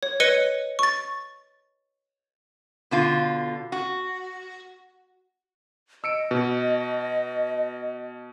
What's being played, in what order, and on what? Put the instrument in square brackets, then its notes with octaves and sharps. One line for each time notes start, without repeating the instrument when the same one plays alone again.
[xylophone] C#5
B4 C#5 D#5 C#7 D#7 G7
C#6 A6
[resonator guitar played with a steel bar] B2 D3 F4
F#4
[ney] D#5 [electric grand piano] E6 C#7 D7
[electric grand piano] B2